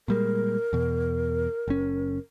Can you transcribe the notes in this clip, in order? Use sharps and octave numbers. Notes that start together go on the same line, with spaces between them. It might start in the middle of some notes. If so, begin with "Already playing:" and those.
A#2 G3 G#3 A#4
E2 B2
F#1 C#4